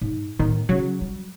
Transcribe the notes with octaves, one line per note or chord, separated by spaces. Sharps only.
G#2
A2 D#3 B3
C#3 F#3
G3